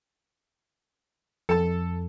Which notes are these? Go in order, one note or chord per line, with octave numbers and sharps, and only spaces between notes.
F2 A4 A5